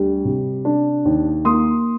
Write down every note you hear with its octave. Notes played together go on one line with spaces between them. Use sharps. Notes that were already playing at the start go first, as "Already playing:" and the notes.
Already playing: D2 G3
C3
D4
D#2
A#3 C6 D#6